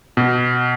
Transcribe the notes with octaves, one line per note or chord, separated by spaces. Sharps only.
B2